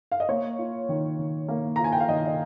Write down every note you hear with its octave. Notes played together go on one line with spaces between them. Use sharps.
F5
D#5
A#3 C#5
F4
D#3
D#3
A#3
F4 A#5
G#5
G5
F5
D#3 D#5
D#5